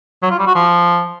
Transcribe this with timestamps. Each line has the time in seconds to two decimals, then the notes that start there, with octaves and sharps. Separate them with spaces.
0.23 F#3
0.31 F4
0.39 G3
0.47 F#4
0.55 F3